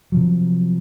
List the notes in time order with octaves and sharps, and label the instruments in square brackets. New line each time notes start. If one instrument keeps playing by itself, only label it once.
[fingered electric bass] C3 F3 F#3